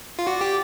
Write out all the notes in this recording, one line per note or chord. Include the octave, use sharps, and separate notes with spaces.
F4
F#4 D5
G4